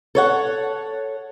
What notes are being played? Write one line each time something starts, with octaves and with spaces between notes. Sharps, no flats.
A4 C#5 F#5